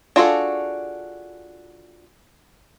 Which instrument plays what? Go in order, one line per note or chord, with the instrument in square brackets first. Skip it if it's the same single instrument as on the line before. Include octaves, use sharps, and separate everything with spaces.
[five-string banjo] D4 F4 F#4 G#4 A4